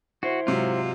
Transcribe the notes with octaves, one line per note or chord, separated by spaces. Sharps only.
E4 F#4 C5
G#2 C3 F#3 F4